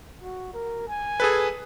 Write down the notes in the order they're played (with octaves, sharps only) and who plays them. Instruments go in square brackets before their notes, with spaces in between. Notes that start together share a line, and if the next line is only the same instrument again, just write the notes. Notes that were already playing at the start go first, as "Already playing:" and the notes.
[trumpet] F#4
A#4
G#5
[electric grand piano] G#4 A4 B4